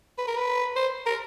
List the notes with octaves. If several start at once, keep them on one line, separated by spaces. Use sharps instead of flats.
B4
A#4
B4
C5
A#4